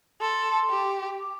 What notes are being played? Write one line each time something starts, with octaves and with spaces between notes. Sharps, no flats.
A4 C6
G4
D6